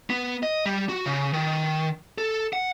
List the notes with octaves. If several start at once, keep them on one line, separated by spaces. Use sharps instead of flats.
B3
D#5
G3
F#4
C#3
D#3
A4
F#5